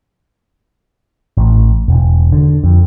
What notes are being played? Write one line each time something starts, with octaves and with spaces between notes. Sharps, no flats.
A1
E1
D3
F2